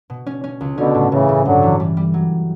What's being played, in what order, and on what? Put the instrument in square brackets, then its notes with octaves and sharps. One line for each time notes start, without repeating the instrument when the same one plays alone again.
[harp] B2
C#4
C#4
C#2
[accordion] B2 D3 [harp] C#4
[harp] A2
[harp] A2 [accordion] C#3 E3
[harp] A2
[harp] G2 [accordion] D3 F#3
[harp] E3
G3
G3
F#3